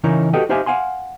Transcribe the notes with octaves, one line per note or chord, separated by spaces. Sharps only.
C#3 E3 C#4 D#4 A#4 C#5
F#4 G4 A4 B4 D#5 G5
D#4 G4 C5 E5 F5 G#5
F5 F#5 G#5 C6